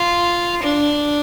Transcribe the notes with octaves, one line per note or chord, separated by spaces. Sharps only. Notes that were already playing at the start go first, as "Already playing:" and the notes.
Already playing: F4
D4